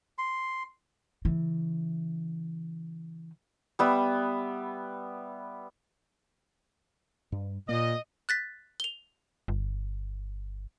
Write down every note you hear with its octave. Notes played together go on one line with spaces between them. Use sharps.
C6
C#3 E3
G3 B3 E5
G2
A#2 A#3 D#5
F#6 A6 B6
F7 G7
G1